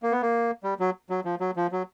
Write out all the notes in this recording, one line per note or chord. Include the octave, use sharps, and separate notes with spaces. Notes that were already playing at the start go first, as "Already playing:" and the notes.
A#3
B3
A#3
G3
F#3
F#3
F3
F#3
F3
F#3